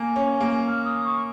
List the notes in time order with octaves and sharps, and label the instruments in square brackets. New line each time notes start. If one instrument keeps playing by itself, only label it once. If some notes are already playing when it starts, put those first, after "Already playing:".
Already playing: [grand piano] A#3 [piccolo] G#5
[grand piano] C#4
A#3
[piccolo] F6
D#6
C#6